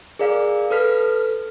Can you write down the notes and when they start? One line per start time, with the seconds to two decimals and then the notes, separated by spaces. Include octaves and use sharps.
0.19 G#4 A#4 D5 F5
0.70 A4 B4 F6 B6